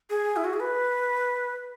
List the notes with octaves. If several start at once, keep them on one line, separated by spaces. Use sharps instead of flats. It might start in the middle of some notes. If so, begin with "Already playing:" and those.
G#4
E4
F#4
G#4
B4